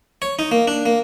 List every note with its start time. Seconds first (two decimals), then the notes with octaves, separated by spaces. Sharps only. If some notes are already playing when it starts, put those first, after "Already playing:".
0.22 C#5
0.39 D#4
0.51 A#3
0.67 D4
0.86 A#3